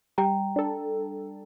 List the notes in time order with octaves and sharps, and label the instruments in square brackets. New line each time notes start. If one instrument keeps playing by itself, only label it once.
[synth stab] G3 [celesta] G5 A#5
[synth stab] D4 A4